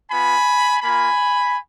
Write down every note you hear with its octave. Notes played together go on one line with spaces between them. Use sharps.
B3 F4 G#5 B5
A#3 F4 G#5 B5